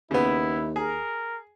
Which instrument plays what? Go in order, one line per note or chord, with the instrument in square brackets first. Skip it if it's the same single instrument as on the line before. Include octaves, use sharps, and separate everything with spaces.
[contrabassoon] D#2 [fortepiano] C#3 B3 [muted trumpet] E4
[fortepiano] G#4 [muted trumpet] A#4